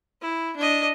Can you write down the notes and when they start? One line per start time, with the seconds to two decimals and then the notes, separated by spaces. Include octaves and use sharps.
0.22 E4
0.57 D4 D#5